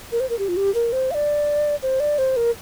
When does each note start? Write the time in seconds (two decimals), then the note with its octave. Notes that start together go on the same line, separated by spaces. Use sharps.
0.12 A#4
0.20 C5
0.30 A#4
0.39 G4
0.48 F4
0.57 G4
0.75 A#4
0.93 C5
1.11 F5
1.14 D5
1.82 C5
2.00 D5
2.18 C5
2.37 A#4